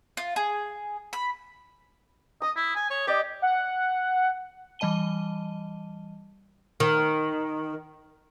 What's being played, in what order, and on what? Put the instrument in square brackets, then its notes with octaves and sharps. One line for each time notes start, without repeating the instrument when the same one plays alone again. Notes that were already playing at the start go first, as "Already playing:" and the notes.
[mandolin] F4
G#4
B5
[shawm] D#5 [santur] D#6
[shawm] E4
G#5
C#5
[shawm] G4 [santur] D5 D#5
[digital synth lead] F#5
[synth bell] E3 G3 D#5 A5 D#7 G7
[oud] D#3